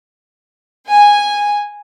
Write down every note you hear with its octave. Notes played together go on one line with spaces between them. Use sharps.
G#5